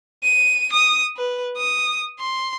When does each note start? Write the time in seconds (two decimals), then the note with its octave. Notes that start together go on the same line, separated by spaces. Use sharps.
0.23 D#7
0.72 D#6
1.17 B4
1.57 D#6
2.19 C6